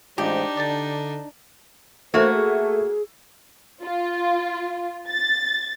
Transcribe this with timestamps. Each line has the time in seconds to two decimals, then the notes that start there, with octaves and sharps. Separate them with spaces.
0.18 A1 G#3 D4 D#4 F4 G4 C5
0.57 D3 D5 A5
2.14 A3 A#3 F#4 C5 C#5
2.34 G#4
3.81 F4
5.09 A6